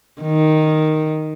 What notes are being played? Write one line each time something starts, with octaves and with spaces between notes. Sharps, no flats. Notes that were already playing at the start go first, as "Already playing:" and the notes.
D#3